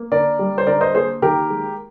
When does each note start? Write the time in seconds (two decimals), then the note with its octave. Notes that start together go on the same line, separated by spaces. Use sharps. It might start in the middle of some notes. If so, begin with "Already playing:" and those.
Already playing: A#3
0.12 D3 A#4 D5
0.39 G3
0.58 C5
0.67 D3 A#4 D5
0.81 C5 D#5
0.94 A#3 G#4 C5
1.22 D#3 G4 A#4
1.50 G#3